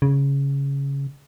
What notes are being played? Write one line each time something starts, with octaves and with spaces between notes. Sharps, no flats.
C#3